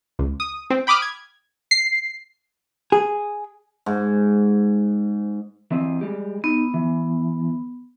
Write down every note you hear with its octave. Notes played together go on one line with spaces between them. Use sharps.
C#2
D#6
C4
G5 B5 D6 D#6 F6
G#6
C7
G#4
G#2
E3 C4 D#5
G3 G#3 G4
B3 D#4
E3